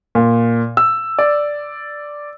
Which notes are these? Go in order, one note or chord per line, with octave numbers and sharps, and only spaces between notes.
A#2
E6
D5